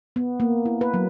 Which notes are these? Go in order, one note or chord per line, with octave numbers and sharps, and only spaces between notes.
B3
A#3
E4
B4
F#3